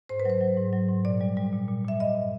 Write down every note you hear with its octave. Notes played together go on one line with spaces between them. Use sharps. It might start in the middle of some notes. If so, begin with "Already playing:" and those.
G#2 C5
B4
F#3 C5
F#3
G#2
F#3
G#2
A#2 D5
G3
G3
A#2
A#2
A#2 E5
G2 D#5